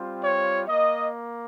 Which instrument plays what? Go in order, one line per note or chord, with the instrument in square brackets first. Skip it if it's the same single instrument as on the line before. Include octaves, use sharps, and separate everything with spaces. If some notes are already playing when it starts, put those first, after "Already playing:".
Already playing: [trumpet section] G3 C4 F4
C#5
A#3 D#5